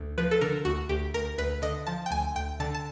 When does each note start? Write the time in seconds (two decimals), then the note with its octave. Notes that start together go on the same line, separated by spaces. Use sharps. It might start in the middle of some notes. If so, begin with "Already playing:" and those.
Already playing: D2
0.18 F3 B4
0.31 A4
0.41 D3 A#4
0.65 D2 F#4
0.89 D2 G4
1.14 D2 A#4
1.38 D2 B4
1.62 D3 D#5
1.87 F3 A5
2.06 G5
2.11 D2 G#5
2.35 D2 G5
2.60 D3 A5
2.75 A5